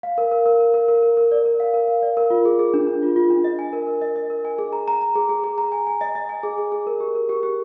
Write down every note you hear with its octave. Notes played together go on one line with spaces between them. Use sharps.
F5
A#4
A#4
A#4
A#4
A#4
A#4
A#4
A#4
D5
A#4
F5
A#4
F5
D5
A#4
F4
G#4
G#4
D4
D4
F4
F4
D4
D#5
G#5
A#4
A#4
D#5
D#5
A#4
G#5
G#4
A#5
A#5
A#5
G#4
G#4
G#4
A#5
G#5
G#5
D#5
D#5
G#5
G#4
G#4
G#4
A#4
G4
A#4
G4
G4